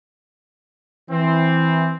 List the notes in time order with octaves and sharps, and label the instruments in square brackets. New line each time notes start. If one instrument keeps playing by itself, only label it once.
[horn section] E3 C4